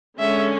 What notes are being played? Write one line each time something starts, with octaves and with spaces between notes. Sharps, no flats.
D3 G#3 C#4 E5